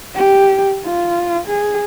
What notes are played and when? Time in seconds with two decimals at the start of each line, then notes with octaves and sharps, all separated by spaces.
0.15 G4
0.86 F4
1.48 G#4